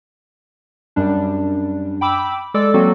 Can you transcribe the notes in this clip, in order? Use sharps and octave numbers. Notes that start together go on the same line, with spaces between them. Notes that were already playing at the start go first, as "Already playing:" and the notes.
F#2 G3 D4
G5 B5 D6 E6
G#3 A4 D5 D6 E6
F#3 A#3 C4 F#4 A4